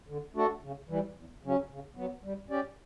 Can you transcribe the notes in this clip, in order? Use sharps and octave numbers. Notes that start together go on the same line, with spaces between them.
D3
A3 D4 F#4 A4
C#3
E3 G3
E2
C#3 F#3 C#4
C#3
F#3 B3
G3
C#4 G4 D5